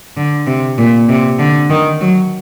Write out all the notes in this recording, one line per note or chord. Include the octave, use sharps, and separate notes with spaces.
D3
C3
A#2
C3
D3
D#3
F#3